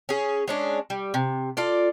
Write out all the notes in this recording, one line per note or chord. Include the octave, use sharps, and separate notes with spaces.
C#4 G#4
G#3 C#4 D4
G3
C3
F4 A4 D5